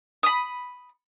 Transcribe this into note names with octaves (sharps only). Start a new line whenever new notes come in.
B5 D#6